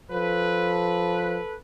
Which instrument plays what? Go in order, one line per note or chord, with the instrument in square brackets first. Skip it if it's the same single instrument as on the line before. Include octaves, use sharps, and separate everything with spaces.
[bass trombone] F3 [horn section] A4 B4